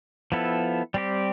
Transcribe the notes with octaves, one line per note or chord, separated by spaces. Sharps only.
F3 B3 E4 A4
G3 C4 G4